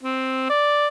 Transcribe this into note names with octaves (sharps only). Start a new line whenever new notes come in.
C4
D5